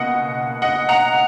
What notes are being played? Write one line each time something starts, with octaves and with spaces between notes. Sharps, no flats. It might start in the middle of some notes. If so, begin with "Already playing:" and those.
Already playing: C#2 B2 A#3 D#5 F#5
D#5 F#5
F#5 A#5